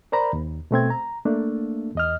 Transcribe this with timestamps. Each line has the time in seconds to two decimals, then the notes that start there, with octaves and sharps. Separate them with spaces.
0.12 A#4 C5 D5 A#5 B5
0.33 D#2
0.71 B2 A3 C4 G#6
0.90 A#5
1.25 A3 A#3 D4
1.95 E2 D#5 F6